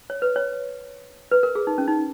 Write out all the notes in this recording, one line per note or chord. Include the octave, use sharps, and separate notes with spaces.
C#5
B4
C#5
B4
A#4
G#4
D#4
C#4
D#4